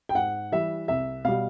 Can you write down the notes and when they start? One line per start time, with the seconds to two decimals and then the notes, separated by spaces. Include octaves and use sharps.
0.09 G5
0.15 G#2 F#5
0.52 E3 G3 E5
0.88 C2 E5
1.24 B2 G3 F5